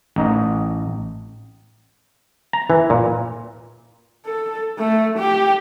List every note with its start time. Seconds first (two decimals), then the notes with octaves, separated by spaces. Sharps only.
0.16 A1 D#4 D#5
2.53 A#5
2.70 E3
2.90 A#2
4.26 A4
4.78 A3
5.17 G4